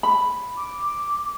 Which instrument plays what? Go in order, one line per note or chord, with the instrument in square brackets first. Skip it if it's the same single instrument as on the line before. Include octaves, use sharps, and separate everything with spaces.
[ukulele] B5
[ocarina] D6